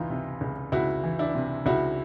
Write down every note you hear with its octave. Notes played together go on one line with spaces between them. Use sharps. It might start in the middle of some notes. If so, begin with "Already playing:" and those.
Already playing: C#2 E3 D#4 F4
C3
C#2
C#2 E4 F#4
E3
D4 E4
C3
C#2 E4 F#4